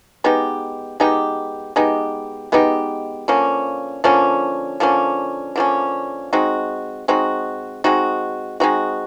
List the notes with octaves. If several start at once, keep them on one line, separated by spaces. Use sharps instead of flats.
G#3 B3 D#4 G4
G#3 B3 D#4 G4
G#3 B3 D#4 G4
G#3 B3 D#4 G4
D3 F3 A#3 C#4
D3 F3 A#3 C#4
D3 F3 A#3 C#4
D3 F3 A#3 C#4
G#3 C4 D#4 F#4
G#3 C4 D#4 F#4
G#3 C4 D#4 F#4
G#3 C4 D#4 F#4